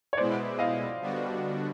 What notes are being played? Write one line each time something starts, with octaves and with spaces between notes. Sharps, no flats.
C#5
B2 G#3 B3 E4 C5 D5
D#5 F5
D3 G3 B3 D4 F#4